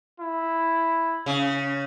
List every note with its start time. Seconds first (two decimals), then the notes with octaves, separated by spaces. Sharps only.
0.20 E4
1.26 C#3